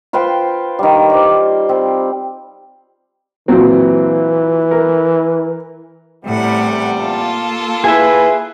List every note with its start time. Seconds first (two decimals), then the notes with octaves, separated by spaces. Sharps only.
0.13 F4 B4 C5 G5
0.79 D#3 G3
1.10 C5 D5
1.69 C4
3.48 A#2 E3 F#3 C4
4.71 A#4
6.25 E2 A2 C3 G3 F#5
6.97 A#3 F4 A4
7.84 E4 G#4 B4 E5